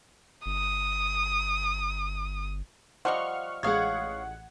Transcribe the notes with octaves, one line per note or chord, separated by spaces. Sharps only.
G1 D#6
F3 G3 D#5 F5 F#5 C#6 F6
A1 G#3 C#5 F5 F#5 D#6 G#6